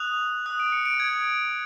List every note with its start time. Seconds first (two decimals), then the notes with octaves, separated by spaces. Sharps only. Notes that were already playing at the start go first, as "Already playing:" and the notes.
Already playing: D#6 F#6 F7
0.46 D#6 F#6
0.60 D7
0.72 C#7
0.86 D7
1.00 G#6